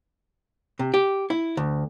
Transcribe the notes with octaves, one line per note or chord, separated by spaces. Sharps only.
C3
G4
E4
D2